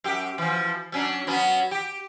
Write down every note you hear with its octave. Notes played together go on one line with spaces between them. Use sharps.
F#2 G4
E3 F3
F#3 C#4 D4
F#3 B3 C#4
G4